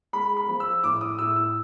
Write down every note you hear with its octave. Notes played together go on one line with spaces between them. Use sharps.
G#3 B5
B5
F3
E6
A2 D6
D#6
A2 E6
E6